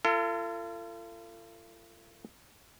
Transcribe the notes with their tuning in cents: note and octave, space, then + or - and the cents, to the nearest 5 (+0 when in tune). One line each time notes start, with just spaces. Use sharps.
F4 -40 A4 +35